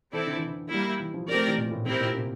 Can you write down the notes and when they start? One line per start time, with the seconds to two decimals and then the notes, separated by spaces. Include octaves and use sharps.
0.12 E3 C4 E4 A4 D5
0.27 D3
0.37 E3
0.46 D3
0.70 G3 A#3 E4
1.00 E3
1.14 F3
1.28 F3 A3 C4 G4 A#4 D5
1.47 E3
1.58 A#2
1.72 A2
1.86 A2 C4 E4 G4 A#4
2.00 A#2
2.15 C3